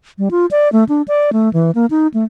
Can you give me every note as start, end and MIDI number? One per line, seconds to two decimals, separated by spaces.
0.18 0.29 55
0.31 0.46 65
0.51 0.71 74
0.72 0.84 57
0.89 1.02 62
1.08 1.31 74
1.33 1.51 57
1.53 1.71 52
1.75 1.86 58
1.90 2.07 63
2.14 2.24 57